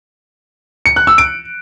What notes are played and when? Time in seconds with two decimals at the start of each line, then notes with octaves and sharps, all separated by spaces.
0.86 C#7
0.96 F#6
1.07 E6
1.18 D7